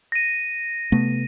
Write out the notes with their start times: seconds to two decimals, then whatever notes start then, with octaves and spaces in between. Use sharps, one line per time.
0.12 A#6 D#7
0.92 C3 A3 B3